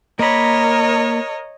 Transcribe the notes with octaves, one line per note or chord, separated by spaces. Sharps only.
A#3 A#4 C#5 D#5 B5